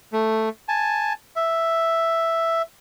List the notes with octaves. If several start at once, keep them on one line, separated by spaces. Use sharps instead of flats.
A3
G#5 A5
E5